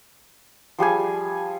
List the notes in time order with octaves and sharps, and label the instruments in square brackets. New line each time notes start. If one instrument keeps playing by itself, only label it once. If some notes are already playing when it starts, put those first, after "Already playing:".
[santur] F3 G3 G#4 G#5